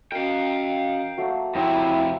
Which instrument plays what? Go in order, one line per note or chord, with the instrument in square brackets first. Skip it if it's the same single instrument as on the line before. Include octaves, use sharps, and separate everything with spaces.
[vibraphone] C#4 F#4 D#5 [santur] A#4 [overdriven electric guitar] F5 G5
[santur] F#3 A3 A#3
[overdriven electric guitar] F2 C3 [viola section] E4 [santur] C#5 E5 A#5 [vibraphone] G5